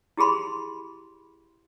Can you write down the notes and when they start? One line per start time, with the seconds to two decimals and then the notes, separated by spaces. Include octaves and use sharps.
0.17 E4 G4 G#4 B5 C6